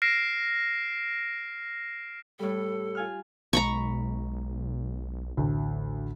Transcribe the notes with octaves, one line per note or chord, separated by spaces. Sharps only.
F6 A#6 C7 D7 E7
A2 G3 A4
F4 G#5 F6
B1 B2 G#3 A#5 B5 C#6
A1 D2 A2